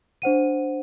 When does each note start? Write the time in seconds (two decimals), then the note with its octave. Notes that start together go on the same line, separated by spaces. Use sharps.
0.22 D4 C5 F#5 D#7